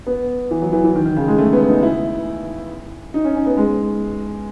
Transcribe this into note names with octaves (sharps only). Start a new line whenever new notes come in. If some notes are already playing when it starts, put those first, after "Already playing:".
B3
E3
F#3
E3
E3
D#3
D#3
C#3
G#3
A3
B3
D#4
E4
D#4
C#4
C#4
B3
G#3